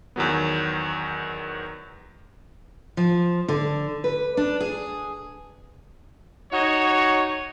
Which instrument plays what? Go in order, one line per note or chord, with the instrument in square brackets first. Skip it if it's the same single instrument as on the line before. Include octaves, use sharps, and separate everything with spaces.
[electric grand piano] E2 D#3 F#3 B3
[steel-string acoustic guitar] F3
D3
B4
D4
G#4
[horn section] D#4 F#4 C#5